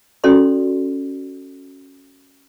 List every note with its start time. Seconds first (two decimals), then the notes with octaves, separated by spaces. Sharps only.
0.24 C#4 F#4 A4 D5 C6